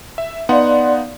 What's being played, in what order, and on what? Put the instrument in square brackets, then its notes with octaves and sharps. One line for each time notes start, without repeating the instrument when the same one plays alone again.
[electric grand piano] E5
[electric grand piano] B3 D#4 F#5 [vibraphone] D5 F5 C6